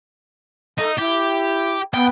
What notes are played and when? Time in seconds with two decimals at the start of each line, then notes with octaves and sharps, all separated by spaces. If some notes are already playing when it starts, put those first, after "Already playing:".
0.78 D#4 A4
0.98 E4 G4
1.94 B3 G5